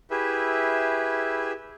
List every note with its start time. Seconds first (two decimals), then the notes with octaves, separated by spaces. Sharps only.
0.11 E4 G4 G#4 B4 E5